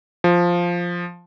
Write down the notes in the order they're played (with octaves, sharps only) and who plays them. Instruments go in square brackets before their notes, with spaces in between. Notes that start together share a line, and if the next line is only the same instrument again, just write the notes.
[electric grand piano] F3